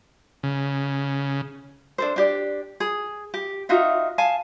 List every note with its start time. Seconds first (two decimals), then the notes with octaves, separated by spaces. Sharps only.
0.43 C#3
1.98 D4 A4 C5
2.16 D4 G4 D5
2.80 G#4
3.34 G4
3.69 D#4 F4 F#4 E5
4.18 F5 G#5 A5